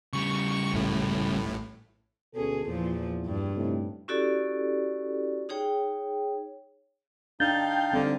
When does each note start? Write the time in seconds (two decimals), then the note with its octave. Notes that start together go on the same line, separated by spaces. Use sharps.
0.13 C#3 G3 C#6
0.73 A1 A2
2.35 D2 B2 C#4 G#4 A4
2.66 E2 A#2 F3
3.26 G2
3.55 A2 C3 D#4
4.08 C#4 E4 F#4 G4 A4 D5
5.49 D#4 G#4 C#5 G5
7.40 D4 D#4 F5 G5 A5 G6
7.93 D3 G3 C4